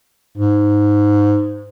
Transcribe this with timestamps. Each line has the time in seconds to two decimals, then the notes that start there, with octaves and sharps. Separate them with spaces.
0.37 G#2